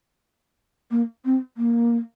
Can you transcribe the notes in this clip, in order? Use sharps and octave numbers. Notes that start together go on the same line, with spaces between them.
A#3
C4
A#3